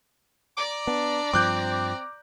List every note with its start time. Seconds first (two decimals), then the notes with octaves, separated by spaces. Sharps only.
0.57 D5 A#5 D6
0.87 B3 D4
1.33 G2 F3 C4 D6 F#6 G6